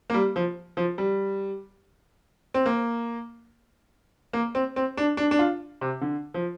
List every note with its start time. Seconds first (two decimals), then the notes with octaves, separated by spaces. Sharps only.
0.10 A#3
0.14 G3
0.36 F3
0.77 F3
0.98 G3
2.54 C4
2.66 A#3
4.33 A#3
4.55 C4
4.76 C4
4.97 D4
5.17 D4
5.31 D4
5.39 F4
5.81 C3
6.01 D3
6.34 F3